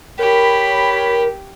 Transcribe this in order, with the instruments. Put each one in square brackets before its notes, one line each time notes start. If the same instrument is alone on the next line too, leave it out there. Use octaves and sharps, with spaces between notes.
[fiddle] G4 [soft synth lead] A#4 [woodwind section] C#5 B5